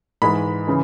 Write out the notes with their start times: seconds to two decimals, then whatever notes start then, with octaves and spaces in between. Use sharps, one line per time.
0.22 G#2 E3 G#3 B5
0.67 C#3 E3